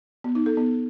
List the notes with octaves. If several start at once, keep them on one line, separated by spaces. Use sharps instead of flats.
B3
D#4
A4
B3